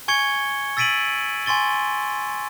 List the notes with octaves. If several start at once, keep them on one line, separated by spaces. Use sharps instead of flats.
G#5 C#6 G#6 C#7 G7
E6 A6 B6 D7 D#7 F#7
G#5 C6 C#6 A6 G7